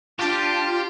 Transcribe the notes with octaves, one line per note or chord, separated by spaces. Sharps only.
D4 F4 G4 A5